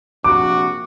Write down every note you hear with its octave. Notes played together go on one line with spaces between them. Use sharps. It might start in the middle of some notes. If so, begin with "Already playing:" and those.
A#1 C3 F#4 D6